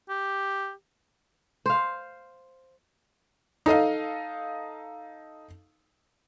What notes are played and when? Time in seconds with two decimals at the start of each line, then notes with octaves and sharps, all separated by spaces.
0.09 G4
1.66 C5 F5
3.66 D#4 A4 D#5 F5